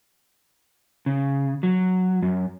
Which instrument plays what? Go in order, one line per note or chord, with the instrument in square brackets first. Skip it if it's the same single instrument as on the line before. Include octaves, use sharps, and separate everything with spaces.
[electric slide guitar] C#3
F#3
F#2